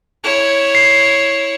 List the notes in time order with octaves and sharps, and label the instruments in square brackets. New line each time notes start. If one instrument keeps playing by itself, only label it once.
[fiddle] E4 C#5
[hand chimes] C7